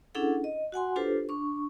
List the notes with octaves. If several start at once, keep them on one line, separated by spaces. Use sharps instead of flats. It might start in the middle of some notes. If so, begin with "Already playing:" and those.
C#4 D4 E4 G#4 A4 F#5
D#5
F#4 F#5 G#5 C6
D4 F4 G4 A4 B4 C5
D4 C#6